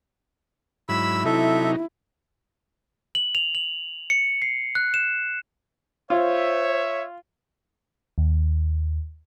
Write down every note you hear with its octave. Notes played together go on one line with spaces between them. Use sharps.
G#2 F#3 E4 B5 E6
C3 F#3 D#4 E4 A4 E5
F#7
F7
F#7
C#7
C7
F#6
E7
F4 C5 C#5 E5
D#2